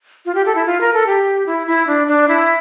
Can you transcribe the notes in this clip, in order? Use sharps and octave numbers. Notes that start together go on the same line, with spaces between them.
F4
G4
A4
E4
F4
A#4
A4
G4
E4
E4
D4
D4
E4